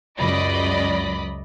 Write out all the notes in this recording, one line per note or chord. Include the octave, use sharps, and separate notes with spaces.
C#2 F#2 D5 D#5 B5